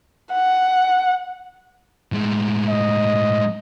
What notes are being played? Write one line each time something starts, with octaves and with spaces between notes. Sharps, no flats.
F#5
A2 G#3
D#5